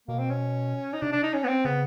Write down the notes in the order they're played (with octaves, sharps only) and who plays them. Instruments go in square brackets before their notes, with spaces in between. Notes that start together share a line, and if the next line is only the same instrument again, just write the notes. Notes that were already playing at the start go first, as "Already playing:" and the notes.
[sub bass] B2 [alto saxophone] A#3
[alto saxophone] C4
C#4
D#4
[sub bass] C3 [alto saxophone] D4
[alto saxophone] D4
D#4
C#4
B3
C4
[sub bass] C#3 [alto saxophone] B3